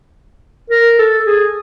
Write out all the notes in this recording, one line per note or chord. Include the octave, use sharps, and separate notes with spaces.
A#4
A4
G#4